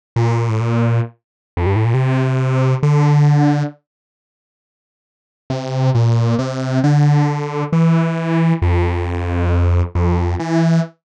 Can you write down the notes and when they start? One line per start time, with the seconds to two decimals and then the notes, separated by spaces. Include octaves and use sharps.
0.16 A#2
0.49 A2
0.60 A#2
1.57 F2
1.66 G2
1.76 A2
1.85 A#2
1.94 C3
2.83 D3
5.50 C3
5.95 A#2
6.39 C3
6.84 D3
7.73 E3
8.62 F2
9.95 F2
10.40 E3